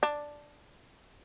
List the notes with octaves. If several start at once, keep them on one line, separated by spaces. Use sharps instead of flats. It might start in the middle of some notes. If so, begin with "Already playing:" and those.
D4